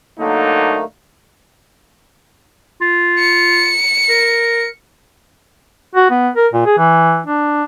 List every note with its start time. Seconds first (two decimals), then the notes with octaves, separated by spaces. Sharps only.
0.19 D3 F#3 A3 A#3 D#4
2.81 F4
3.19 C#7
4.09 A#4
5.95 F#4
6.10 B3
6.36 A#4
6.53 A#2
6.66 G#4
6.78 E3
7.26 D4